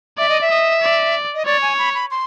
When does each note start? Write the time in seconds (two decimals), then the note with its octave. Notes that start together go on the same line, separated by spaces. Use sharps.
0.18 D5 E5
0.29 D#5
0.41 E5
0.50 D#5
0.82 D5
1.35 D#5
1.46 C#5 D5
1.62 G#5
1.78 B5
1.94 B5
2.11 C6